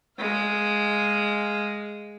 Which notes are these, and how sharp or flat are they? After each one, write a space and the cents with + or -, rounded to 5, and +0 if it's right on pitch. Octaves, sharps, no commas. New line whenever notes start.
G#3 +0 F5 +0